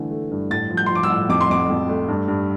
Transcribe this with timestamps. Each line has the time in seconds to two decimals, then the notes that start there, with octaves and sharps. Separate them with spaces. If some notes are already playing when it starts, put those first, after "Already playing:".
Already playing: D3 E3 A3
0.11 A3
0.31 G2
0.50 A2 A6
0.70 F3
0.77 G6
0.86 C6
0.90 F3
0.95 D6
1.03 E6
1.10 A2
1.29 F2 D6
1.41 C6
1.50 F2 D6
1.70 F2
1.89 A3
2.08 G2
2.28 G2